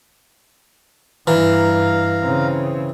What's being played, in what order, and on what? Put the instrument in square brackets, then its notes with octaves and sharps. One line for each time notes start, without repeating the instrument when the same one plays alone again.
[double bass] G2 [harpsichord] E3 [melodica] F5 A#5
[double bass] C#3 C4